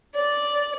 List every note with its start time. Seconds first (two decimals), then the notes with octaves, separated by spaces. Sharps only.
0.15 D5